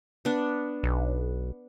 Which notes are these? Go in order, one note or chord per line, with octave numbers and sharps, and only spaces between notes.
B3 D4
B1